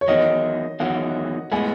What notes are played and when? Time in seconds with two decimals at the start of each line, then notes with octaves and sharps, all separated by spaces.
0.01 C#5
0.08 E2 D#3 F#3 D#5
0.80 E2 D#3 F#3 F#5
1.52 A2 G#3 B3 G#5